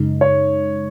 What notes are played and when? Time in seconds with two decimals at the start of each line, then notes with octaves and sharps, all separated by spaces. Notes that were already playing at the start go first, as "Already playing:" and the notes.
Already playing: F#2 C#3 G#3 D#4
0.21 C#5